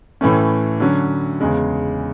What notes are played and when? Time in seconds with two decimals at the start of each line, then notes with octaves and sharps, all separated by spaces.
0.21 A2 E3 A3 C#4
0.80 D3 F#3 C#4
1.40 E2 C#3 G#3